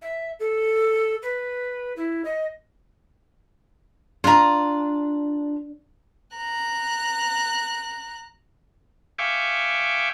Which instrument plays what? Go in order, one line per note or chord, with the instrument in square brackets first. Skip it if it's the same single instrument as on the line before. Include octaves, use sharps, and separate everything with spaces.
[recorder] E5
A4
B4
E4
D#5
[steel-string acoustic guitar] D4 [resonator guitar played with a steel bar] F4 A#5
[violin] A#5 F#6
[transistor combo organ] E5 F5 G5 G#5 C#6 D6